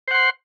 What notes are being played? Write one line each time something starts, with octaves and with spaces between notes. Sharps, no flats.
C5 F#5 C6